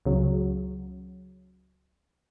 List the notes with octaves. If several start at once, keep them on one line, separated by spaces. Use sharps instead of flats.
C#2 C#3 F#3